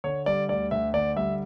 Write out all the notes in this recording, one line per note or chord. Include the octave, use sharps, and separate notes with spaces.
D3 C#5
G3 D5
D2 D5
D2 E5
D3 D5
G3 E5